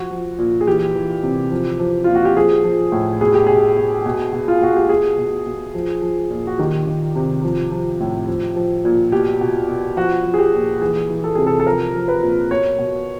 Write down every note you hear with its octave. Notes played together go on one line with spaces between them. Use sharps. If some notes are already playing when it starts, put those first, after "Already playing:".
Already playing: F3 F#4
F3
A#2
G#4
E3 G4
E3
C3
F3
F3
A#2 F4
F#4
G4
F3 G#4
F3
A2
B2 G#4
G4
B2 G#4
B2
B2
B2
F4
B2 F#4
G4
B2 G#4
B2
B2
F3
F3
A#2
F#4
D#3 G4
D#3
C3
F3
F3
A2
F3
F3
A#2
B2 G4
B2
B2
F3 F#4
F3
G#4
G4
A#2
E3 G#4
E3
A4
C3 G#4
A4
A4
F3 A#4
F3
B4
A#2
B2 C#5
B2